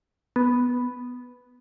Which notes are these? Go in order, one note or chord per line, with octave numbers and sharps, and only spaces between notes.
B3